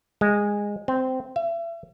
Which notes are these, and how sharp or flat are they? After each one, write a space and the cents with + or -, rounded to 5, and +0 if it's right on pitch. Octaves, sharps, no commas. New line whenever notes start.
G#3 -15
C4 -15
E5 +35